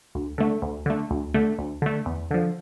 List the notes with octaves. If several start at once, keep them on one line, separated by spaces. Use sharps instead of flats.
D2
D3 A3
D2
D3 A3
D2
D3 A3
D2
D3 A3
E2
D3 F3